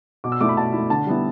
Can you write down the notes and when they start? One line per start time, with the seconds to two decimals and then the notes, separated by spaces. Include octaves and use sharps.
0.24 B2 D6
0.32 E6
0.41 A3 E4 D6
0.49 B5
0.57 B2 A5
0.73 A3 E4
0.90 D3 A5
1.06 G3 B3 E4